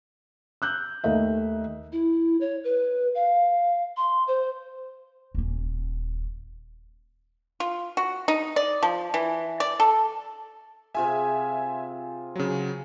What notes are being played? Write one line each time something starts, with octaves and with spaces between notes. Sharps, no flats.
E6 F#6 G6
D#2 A3 D#5 E5
E4
C#5
B4
F5
C6
C5
D#1 C#4
F4
F#4
D#4
D5
F3
E3
D5
A4
C3 F4 G#4 E5 G#5
C#3 F#3